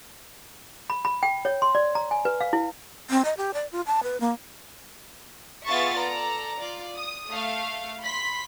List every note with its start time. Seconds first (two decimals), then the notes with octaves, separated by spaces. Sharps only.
0.90 B5
1.05 B5
1.23 G5
1.45 C#5
1.62 C6
1.75 D5
1.95 A#5
2.11 G#5
2.25 B4
2.41 F5
2.53 E4
3.10 C4
3.25 D#5
3.37 G4
3.54 D5
3.72 F4
3.87 A5
4.03 B4
4.21 A#3
5.66 B3 F4 G#4 E5 C#6 A6
5.96 A4 D5 A#5
6.59 F4 D5
6.96 D#6
7.32 A3 F5
8.01 B5 C6 B6